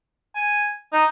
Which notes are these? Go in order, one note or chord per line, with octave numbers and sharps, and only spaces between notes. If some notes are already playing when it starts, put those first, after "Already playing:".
G#5
D#4